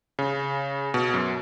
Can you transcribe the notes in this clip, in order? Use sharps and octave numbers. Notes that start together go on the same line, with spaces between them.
C#3
B2
F#2